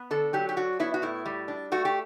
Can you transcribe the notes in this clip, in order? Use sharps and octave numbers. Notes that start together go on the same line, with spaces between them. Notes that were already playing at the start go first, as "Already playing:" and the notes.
Already playing: B3
D3 A4
F#3 G4
G4
D4 F#4
B3 E4
F#4
A2 E4
G3
D4
A3 F#4
G4